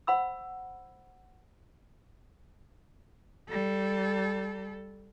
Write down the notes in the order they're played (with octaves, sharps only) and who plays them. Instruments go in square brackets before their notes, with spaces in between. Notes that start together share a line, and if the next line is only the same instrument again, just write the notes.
[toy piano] C5 F#5 B5 E6
[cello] G3 A4